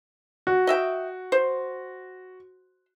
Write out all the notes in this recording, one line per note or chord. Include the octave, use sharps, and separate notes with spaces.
F#4
D#5 E5 G5
C5